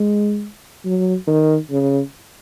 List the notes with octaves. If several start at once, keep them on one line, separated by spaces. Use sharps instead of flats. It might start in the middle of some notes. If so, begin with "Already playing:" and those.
Already playing: G#3
F#3
D#3
C#3